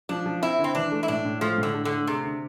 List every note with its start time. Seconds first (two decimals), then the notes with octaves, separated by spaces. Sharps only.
0.09 F3 D4
0.26 F3
0.42 C4 E4
0.59 D3
0.64 C4
0.75 E3 D4
0.91 A3
1.03 E4
1.08 A2 D4
1.25 A2
1.41 F3 A3
1.58 A2
1.63 D3
1.74 A3
1.85 D3
1.91 A3
2.07 C3 G#4
2.24 D3